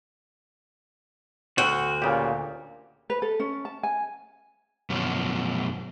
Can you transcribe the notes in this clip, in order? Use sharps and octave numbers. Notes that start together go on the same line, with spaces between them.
D2 F#4 G5
A#2 C#3 G4
B4
A4
C#4
A5
G#5
F#2 B2 F3